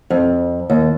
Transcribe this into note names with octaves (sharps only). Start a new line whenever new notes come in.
F2
D#2